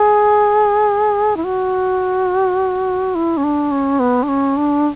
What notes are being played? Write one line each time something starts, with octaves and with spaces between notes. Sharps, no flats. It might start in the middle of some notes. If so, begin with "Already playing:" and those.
Already playing: G#4
E4
F#4
E4
C#4
D4
C#4
B3
D4
C#4
D4